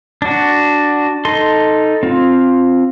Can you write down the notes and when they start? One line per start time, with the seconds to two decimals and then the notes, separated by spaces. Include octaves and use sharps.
0.22 D4 F#4
1.25 D#4 A4 C6
2.03 C4 F4